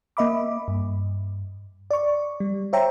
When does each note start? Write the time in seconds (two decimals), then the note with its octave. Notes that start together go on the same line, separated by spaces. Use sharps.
0.17 A#3 D#5 E5 B5 D6
0.68 G2
1.91 D5 C#6
2.40 G3
2.73 C5 C#5 E5 G5 A#5